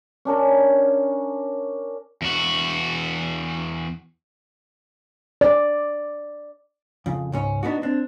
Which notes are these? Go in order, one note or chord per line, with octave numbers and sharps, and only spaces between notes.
C#4 D4 A#4
E2 F#4
D5
F2 C#3
C#2 G#2 C#4
B3 D4 D#4 F#4
C4 D4